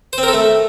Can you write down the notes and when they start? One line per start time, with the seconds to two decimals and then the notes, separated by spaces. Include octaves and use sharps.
0.13 C5
0.18 C4
0.23 A#4
0.28 A4
0.33 A3